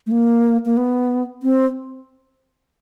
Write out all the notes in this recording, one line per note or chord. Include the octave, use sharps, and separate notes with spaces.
A3
A#3
A#3
B3
C4